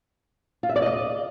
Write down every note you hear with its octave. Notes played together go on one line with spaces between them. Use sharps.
F4
E5
D5
D#5